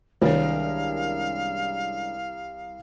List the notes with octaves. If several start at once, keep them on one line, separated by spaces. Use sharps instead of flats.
C2 D#3 G#3 C#4 D4 A#4 C#5 F5